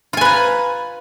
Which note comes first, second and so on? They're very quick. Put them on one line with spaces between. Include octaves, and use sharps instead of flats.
F4 G#5 B4 A#5